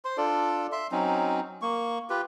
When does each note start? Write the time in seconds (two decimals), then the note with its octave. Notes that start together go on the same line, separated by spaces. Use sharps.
0.05 C5 C6
0.17 D4 F4 A4 D5
0.72 E5 C6
0.92 F#3 C4 C#4 D#4
1.62 A#3 C#6
2.10 F4 G4 B4